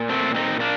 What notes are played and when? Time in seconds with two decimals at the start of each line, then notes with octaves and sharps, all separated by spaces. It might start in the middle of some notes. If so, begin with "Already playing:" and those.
Already playing: A#2
0.09 A3 C4
0.34 C4 D#4
0.60 A#3 D4